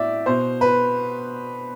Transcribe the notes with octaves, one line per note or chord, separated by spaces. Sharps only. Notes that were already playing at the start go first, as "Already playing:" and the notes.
Already playing: A2 D5 E5
B2 C5
B4